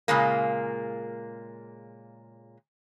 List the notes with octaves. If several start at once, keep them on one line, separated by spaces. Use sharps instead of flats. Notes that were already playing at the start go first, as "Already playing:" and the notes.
A#2 C#3 G#3 A#3